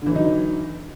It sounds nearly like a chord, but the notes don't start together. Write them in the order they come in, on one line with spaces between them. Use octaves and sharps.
D3 E3 F#3 D#4